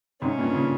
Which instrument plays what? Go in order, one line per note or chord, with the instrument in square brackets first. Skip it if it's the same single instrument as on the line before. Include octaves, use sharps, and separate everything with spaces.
[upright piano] G#2 C3 [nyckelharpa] C#4
[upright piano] G2 A#2
A#2 C#3